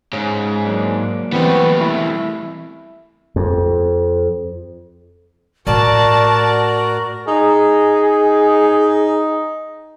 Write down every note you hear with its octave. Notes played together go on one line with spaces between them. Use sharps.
G#2 C#3
F#3 A#3 D4
E3 G3 A3 B3 C4
E4
F2
A2 F#4 A#4 D5 A5
D#4 G#4